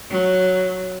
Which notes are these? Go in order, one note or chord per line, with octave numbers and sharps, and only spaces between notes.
F#3